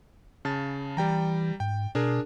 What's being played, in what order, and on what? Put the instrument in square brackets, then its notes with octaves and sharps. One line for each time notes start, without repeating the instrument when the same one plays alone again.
[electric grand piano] C#3 A5 A6
[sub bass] E3 [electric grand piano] G3 G5 A#5
[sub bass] G#2 [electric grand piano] G5
[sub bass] B2 [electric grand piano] D4 G#4 A#4